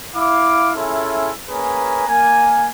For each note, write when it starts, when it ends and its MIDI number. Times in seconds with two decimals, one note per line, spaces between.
0.15 0.72 64
0.15 0.72 77
0.15 0.72 86
0.76 1.32 61
0.76 1.32 64
0.76 1.32 65
0.76 1.32 68
0.76 1.32 69
0.76 1.32 76
1.49 2.05 58
1.49 2.05 61
1.49 2.05 68
1.49 2.05 71
1.49 2.05 80
1.49 2.05 82
2.09 2.69 58
2.09 2.69 80